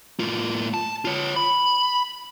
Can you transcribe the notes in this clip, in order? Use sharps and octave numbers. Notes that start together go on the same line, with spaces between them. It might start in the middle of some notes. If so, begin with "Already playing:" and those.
A2 F4
A5
F4 C#5
B5